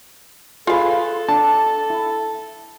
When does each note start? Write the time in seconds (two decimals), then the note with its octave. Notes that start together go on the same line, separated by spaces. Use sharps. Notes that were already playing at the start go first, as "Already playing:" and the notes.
0.67 F4 G#4 A4 B4 F5
1.29 D4 A5
1.90 E4